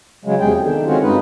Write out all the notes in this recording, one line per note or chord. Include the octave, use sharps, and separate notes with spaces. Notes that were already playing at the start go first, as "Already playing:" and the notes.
C#3 F#3 G#3
E2 C3 G#4 G5
D3 D#3
G#3 C4 C#4 F4 F#4
G2 D#4 B4